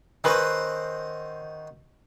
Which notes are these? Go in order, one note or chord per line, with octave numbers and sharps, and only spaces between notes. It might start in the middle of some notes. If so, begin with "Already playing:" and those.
D#3 C#4 F#4 B4 C5 D#5 C6 E6